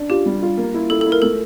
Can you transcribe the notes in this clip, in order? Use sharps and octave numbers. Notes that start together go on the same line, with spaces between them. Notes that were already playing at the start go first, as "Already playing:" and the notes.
Already playing: D4
F4 G4
G3
F4
A#3
E4
E4 A4
E4 A4
A#4
A3 A4